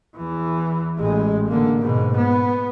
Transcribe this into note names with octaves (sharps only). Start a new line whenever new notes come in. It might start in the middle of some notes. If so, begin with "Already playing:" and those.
E2 E3
A1 G#3
D3 A#3
G#2 B2
B3